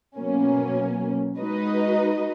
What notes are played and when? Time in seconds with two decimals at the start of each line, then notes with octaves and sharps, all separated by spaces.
0.17 B2 F#3 A#3 C#4
1.38 G#3 D#4 F#4 B4 D#5